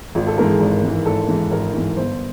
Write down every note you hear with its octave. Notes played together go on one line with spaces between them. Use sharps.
G#1 F4
A4
G#2 E3 A#4
G#4
G#1
G#2 E3
G#1 A4
G#2 E3
G#1 A#4
G#2 E3
G1 C5